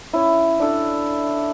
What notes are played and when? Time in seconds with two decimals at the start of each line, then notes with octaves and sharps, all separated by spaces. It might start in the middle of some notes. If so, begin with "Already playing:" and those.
0.13 C#4 E4
0.60 D4 A4